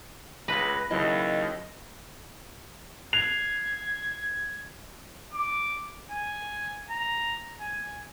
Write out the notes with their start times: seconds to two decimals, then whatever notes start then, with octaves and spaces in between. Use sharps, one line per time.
0.48 C#2 B4 A#6
0.91 D#2 C#3 F#3 E4 D#5
3.13 F#6 G#6 C7 F7
5.34 D6
6.11 G#5
6.90 A#5
7.61 G#5